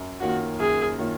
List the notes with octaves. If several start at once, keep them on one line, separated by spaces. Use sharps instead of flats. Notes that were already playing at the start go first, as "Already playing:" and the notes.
Already playing: F#2
D#3 A#3 C#4 F4 F#4
F#2 G#4
D#3 A#3 C#4 F4